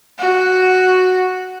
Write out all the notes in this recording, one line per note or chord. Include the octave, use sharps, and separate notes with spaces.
F#4